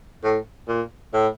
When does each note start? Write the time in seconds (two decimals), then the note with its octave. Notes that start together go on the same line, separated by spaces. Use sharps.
0.24 A2
0.68 A#2
1.13 A2